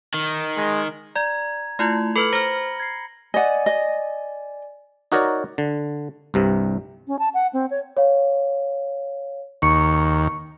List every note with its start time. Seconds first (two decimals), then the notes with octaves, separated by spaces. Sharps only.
0.14 D#3
0.57 G#3
1.15 D5 A#5 G#6
1.79 A3 E4 F4
2.16 A4 B4 B5 F6 C#7 F#7
2.33 C5 A#5 F6 A#6 G7
2.80 G#6 C7
3.34 D5 D#5 F#5 G#5
3.66 D#5
5.12 D#4 F#4 A#4 C#5 D5
5.58 D3
6.34 C2 G2 C3
7.07 C#4
7.19 A5
7.34 F#5
7.53 C4
7.70 C#5
7.97 C#5 F5
9.62 D#2 C#6 C#7